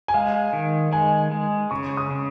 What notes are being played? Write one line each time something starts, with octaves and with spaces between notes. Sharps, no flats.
G#5
G#3 F5
D#3
G#3 G#5
G#3
C#3 C#6
D#6
C#3